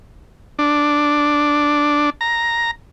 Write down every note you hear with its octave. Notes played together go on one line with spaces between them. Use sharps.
D4
A#5